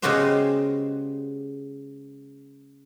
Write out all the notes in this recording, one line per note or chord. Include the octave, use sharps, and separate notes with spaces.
C#3 G#3 B3 F#4 G4 C5